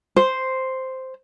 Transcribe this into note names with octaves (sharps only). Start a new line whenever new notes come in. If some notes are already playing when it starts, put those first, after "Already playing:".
C5